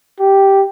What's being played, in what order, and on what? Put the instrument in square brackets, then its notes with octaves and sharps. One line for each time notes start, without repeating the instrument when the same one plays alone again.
[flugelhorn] G4